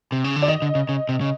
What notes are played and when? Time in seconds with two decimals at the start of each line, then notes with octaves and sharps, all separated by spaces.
0.12 C3
0.24 C#3
0.36 D3
0.42 D5
0.48 D#3 D#5
0.62 D3
0.75 C#3
0.89 C#3
1.09 C3
1.21 C#3